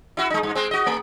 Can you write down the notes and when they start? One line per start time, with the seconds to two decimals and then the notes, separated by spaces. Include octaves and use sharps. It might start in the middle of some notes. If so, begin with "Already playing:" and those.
0.17 E4 F#4
0.30 G#3 D#4
0.43 G2
0.55 G#3 C4
0.71 F#4 D#5
0.86 A3